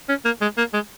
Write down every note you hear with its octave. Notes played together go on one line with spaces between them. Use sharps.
C#4
A#3
G#3
A#3
G#3